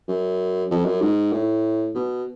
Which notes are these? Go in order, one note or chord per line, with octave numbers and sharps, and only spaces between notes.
F#2
F2
F#2
G#2
A2
B2